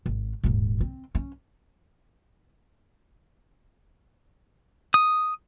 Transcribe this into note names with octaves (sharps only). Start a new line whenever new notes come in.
G#1
D#1 G#2
C4
C#4
D#6